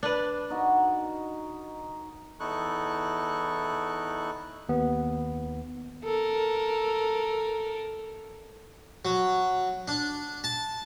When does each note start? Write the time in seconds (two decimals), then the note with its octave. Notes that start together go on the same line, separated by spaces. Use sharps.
0.03 D4 B4
0.50 D#4 F#4 A#4
2.40 E2 D#4 E4 A4 C#6 F#6
4.69 D#2 B3
6.04 A4 A#4
9.05 F#3
9.88 D4
10.44 A5